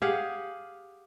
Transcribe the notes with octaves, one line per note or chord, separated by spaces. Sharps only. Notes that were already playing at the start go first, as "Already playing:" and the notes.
G4 G#4 F5 F#5